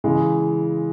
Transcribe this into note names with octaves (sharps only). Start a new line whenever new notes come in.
C#3 E3 G#3